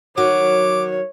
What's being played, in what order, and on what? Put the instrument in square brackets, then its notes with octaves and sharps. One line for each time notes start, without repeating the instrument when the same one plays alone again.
[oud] D#3 F#3 [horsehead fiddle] C#5 [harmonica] D6